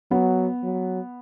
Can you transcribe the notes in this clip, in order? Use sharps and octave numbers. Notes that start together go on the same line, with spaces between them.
F#3 B3
F#3